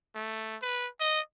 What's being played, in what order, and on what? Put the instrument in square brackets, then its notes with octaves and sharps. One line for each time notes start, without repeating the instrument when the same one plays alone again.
[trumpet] A3
B4
D#5